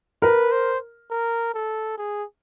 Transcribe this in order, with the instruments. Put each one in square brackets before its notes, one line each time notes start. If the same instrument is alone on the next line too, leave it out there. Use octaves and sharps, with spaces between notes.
[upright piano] A#4 [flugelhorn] B4
[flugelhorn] C5
A#4
A4
G#4